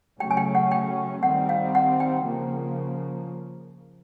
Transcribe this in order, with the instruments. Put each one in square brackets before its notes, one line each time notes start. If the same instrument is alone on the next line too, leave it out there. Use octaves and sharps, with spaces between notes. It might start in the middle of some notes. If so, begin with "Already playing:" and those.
[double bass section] C#3 F#3 A3 C#4 [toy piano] G5
[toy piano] G#5
G5
F#5
G5
[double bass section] D#3 G3 C4 [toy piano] F#5
[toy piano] F5
F#5
G5
[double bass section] C#3 F3 A#3